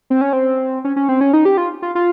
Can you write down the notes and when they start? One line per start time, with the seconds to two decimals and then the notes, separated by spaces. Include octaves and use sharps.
0.10 C4
0.21 C#4
0.33 C4
0.85 C#4
0.96 C#4
1.09 C4
1.21 C#4
1.33 D#4
1.45 G4
1.57 F4
1.82 F4
1.95 F4